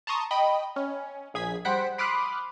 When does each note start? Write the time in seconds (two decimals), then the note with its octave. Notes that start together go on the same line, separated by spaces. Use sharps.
0.07 A5 A#5 C6 C#6 D#6
0.31 D#5 G5 B5
0.76 C#4
1.34 A#1 G#4 G#6 B6
1.65 G3 C5 F#5 F#6 B6 D7
1.98 B5 C6 D6 D#6 F6 F#6